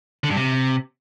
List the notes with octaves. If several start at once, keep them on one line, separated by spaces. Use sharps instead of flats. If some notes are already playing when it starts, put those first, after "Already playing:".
D3
G2
C3